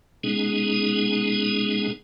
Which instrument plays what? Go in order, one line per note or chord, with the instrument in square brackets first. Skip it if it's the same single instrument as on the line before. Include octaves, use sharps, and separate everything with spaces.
[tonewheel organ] B2 G#3 B3 C#4 D#4 G#4